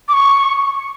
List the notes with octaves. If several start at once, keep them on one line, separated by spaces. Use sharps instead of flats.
D6
C#6